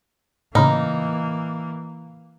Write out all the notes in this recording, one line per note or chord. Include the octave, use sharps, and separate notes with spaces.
A2 C#3 E3 A#3 D#4 A#5 B5 F6